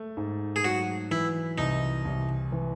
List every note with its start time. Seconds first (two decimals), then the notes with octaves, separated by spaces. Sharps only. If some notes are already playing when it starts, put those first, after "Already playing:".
Already playing: A3
0.17 G#2
0.56 G#4
0.64 F#3 F#4
1.11 E3 E4
1.58 C2 D#4
2.05 C2
2.52 E3